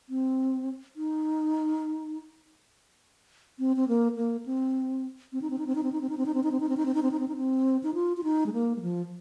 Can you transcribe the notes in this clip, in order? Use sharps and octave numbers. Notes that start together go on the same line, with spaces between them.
C4
D#4
C4
C4
A#3
A#3
C4
C4
D#4
C4
D#4
C4
D#4
C4
D#4
C4
D#4
C4
D#4
C4
D#4
C4
D#4
C4
D#4
C4
D#4
C4
D#4
C4
D#4
C4
D#4
F4
F4
D#4
G#3
A#3
G#3
F3